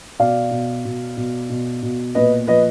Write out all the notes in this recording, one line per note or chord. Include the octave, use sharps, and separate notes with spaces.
B2 D5 F5
B2
B2
B2
B2
B2
A#2 B4 D#5
F3 B4 D#5